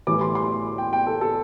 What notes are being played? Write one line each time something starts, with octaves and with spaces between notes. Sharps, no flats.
A2 E3 G3 D6
C6
C6
G5
G5
A4
A4